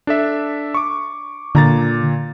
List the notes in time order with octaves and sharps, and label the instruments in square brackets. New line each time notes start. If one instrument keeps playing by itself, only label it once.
[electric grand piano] D4 A4 E5
C#6 D6
[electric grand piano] A#2 A#5 A6 [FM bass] D3